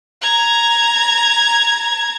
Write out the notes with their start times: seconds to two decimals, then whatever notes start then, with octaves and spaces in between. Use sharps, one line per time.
0.22 A#5 G#6